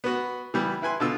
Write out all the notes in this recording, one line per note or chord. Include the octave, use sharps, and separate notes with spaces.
B3 F#4
E3 G3 B3
E4 B4 G#5 C6
B2 D3 F4 E6